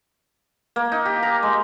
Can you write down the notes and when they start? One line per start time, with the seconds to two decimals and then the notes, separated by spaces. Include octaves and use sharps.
0.76 A#3
0.92 D#4
1.06 G4
1.23 A#5
1.43 G#3